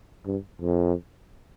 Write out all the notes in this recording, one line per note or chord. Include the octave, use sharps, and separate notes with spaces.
G2
F2